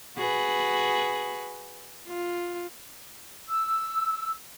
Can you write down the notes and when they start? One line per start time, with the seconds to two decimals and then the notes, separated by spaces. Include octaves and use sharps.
0.17 F#4 G#4 B4
2.07 F4
3.48 E6